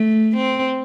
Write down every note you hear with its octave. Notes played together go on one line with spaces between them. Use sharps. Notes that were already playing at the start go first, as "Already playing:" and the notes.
Already playing: A3
C4